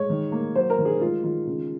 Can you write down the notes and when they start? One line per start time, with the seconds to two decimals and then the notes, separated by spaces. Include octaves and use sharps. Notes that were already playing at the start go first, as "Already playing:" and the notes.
Already playing: G#3 C#5
0.10 D#3
0.32 A#3
0.55 F#3 C5
0.70 A#4
0.79 D#3
0.85 G#4
1.01 G#3 F4
1.24 D#3 F4
1.47 C#3